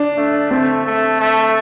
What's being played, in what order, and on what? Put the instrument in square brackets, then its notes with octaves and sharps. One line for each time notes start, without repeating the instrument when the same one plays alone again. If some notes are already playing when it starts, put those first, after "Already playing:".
Already playing: [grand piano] D4
[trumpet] A3
[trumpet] A3 [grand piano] C4
[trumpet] A3
A3